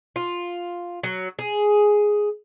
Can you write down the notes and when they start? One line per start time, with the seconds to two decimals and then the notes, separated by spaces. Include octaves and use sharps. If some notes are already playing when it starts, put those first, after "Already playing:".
0.16 F4
1.03 F#3
1.39 G#4